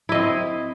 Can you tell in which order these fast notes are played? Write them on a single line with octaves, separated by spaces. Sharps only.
E4 D#5 C4